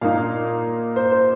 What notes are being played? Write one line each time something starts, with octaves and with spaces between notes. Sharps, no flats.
A#2 A#3 D#4 F5
C5
C5